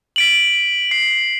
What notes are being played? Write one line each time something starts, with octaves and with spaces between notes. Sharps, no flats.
B6 D7 F#7
C7